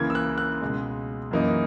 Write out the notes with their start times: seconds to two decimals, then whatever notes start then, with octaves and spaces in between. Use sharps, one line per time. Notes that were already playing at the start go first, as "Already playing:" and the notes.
Already playing: C#2 C#3 E3 A#3 G#6
0.10 E6
0.15 F#6
0.38 F#6
0.61 C#2 B2 G#3
1.31 F#2 E3 A#3 D#4